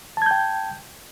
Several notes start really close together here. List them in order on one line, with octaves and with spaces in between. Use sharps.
A5 G#6 G6 G5